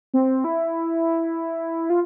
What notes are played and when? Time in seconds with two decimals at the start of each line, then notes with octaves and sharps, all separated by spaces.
0.14 C4
0.44 E4
1.90 F4